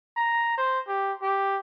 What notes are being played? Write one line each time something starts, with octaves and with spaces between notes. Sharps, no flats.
A#5
C5
G4
G4